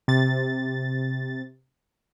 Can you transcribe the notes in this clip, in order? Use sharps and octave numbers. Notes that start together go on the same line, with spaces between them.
C3 A6